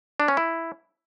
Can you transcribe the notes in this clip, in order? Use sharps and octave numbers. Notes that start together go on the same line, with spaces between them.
D4
C#4
E4